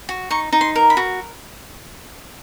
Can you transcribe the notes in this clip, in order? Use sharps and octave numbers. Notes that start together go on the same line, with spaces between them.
F#4
D#4 C#6
D#4
C6
A#4
B5
F#4